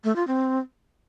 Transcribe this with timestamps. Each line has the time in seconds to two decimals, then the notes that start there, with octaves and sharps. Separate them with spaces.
0.04 A3
0.16 F4
0.27 C4